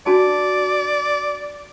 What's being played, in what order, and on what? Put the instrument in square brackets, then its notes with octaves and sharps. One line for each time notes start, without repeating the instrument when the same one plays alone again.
[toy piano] D4 F#4 A5 [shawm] D5